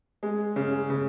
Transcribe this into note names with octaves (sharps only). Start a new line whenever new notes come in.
G#3
C#3
C#3